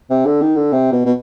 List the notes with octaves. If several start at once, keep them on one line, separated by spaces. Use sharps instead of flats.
C3
D3
D#3
D3
C3
B2
B2